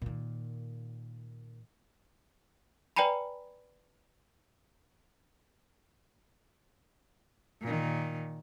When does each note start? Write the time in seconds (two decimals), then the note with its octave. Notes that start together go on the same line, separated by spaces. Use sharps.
0.02 A#2 D#3
2.96 B4 D5 G5 G#5 A#5 B5
7.62 A#2 D#3